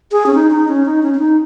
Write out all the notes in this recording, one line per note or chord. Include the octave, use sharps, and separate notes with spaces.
G#4
C#4
D#4
D#4
C#4
D#4
C#4
C#4
D#4